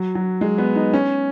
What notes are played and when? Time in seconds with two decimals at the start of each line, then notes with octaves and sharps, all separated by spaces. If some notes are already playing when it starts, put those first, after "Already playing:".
Already playing: F#3
0.15 F#3
0.41 G#3
0.58 B3
0.75 D#4
0.93 C#4